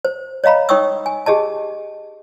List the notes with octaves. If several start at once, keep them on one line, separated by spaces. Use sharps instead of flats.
C5
C#5 D#5 F5 A#5 B5
D#4 C#5 G5 C#6 D#6 E6
G#5
G4 G#4 D#5 A5